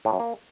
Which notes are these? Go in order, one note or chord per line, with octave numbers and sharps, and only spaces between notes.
A2
F#2
A#3